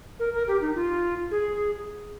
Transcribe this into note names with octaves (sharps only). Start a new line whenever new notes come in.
A#4
A#4
G4
D#4
F4
G#4